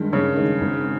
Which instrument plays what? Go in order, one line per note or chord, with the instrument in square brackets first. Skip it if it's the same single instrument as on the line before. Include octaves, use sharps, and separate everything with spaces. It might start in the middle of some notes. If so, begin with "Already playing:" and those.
Already playing: [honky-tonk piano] G2 D#3 G#3
[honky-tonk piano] G2 [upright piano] C#3 C#4
[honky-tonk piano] D#3 G#3
G#1